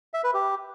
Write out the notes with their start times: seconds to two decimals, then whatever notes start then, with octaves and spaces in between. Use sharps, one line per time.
0.14 E5
0.24 B4
0.34 G4